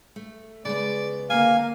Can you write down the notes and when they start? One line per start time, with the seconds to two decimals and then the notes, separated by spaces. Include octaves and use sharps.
0.16 A3
0.65 C#3 G#3 B3 D5
1.30 D3 A#3 F5 G#5